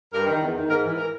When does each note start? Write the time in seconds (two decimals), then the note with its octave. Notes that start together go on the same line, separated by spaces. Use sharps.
0.13 G2 A#4
0.27 D#3
0.41 E2
0.55 D#3
0.69 G#2 A#4
0.84 E3
0.98 A#4